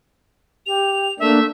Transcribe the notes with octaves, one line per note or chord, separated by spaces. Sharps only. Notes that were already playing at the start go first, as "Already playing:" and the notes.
G4 F7
A3 A#3 D4 E5